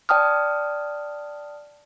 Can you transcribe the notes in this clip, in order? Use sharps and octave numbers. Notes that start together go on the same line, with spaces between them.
D5 G5 A5 D#6 F6